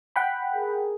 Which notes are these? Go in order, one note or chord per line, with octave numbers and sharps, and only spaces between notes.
F#5 G5 B5
G#4 A#4